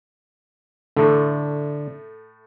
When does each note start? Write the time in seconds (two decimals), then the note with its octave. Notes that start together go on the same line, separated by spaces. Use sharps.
0.96 A2 D3 A3